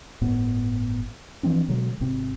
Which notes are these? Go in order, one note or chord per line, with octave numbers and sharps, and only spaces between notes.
G1 A2 B3
E3 F3 C4 D4
B2 D3 F#3 G#3
G#1 C3 C4